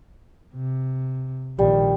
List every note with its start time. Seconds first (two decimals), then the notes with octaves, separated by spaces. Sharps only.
0.55 C3
1.59 A#1 D#3 G3